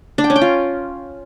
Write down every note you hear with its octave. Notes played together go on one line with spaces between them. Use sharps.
D4
G5
C#4
G5
F4